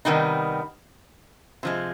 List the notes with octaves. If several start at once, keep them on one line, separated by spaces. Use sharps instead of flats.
C3 D#3 G3 B3 D#4
C3 F3 G#3